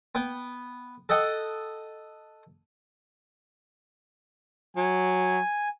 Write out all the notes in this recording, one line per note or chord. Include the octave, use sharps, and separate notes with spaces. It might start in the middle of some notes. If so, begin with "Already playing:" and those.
B3 G5
A4 D#5 F#5 G5
F#3 G#5